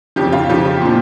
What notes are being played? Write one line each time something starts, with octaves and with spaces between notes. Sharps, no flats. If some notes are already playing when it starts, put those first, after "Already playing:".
F2 C#3 F3 G4
F4
F2 C#3 F3 G4
A#2 F3